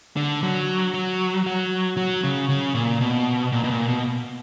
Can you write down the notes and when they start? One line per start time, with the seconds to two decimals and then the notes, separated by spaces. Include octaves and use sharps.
0.17 D3
0.43 F#3
0.94 F#3
1.46 F#3
1.97 F#3
2.23 C#3
2.49 C#3
2.75 A#2
3.01 B2
3.52 A#2
3.64 B2
3.71 A#2
3.88 B2